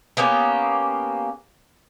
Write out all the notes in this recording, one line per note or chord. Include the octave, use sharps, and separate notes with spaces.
A#3 B3 C#4 G4